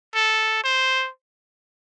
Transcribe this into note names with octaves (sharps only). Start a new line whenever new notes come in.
A4
C5